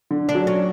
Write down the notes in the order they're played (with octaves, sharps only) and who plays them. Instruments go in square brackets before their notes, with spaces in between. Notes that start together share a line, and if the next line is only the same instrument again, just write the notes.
[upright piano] D3
[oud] D4
[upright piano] F#3
[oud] C#4